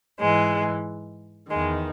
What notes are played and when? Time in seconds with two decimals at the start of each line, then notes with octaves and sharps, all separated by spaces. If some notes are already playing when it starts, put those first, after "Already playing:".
0.19 G#2 E3 G#3
1.49 E2 D#3 G#3